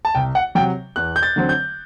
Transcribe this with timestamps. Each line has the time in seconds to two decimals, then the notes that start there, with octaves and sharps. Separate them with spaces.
0.05 A5
0.15 C2 G5
0.35 F#5
0.55 F#3 G5
0.59 C3
0.96 E2 F#6
1.16 G6
1.23 A6
1.36 D3 F#3 C4
1.49 G6